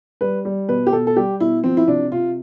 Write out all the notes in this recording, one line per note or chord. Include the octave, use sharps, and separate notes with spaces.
G3 B4
G3
B2 B4
G4
B2 A4
A4
G3 G4
B2 E4
F3 C4
E4
C3 D4
C3 F4